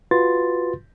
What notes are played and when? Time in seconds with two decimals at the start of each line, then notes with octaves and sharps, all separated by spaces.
0.11 F4 F#4 B4 C6 A6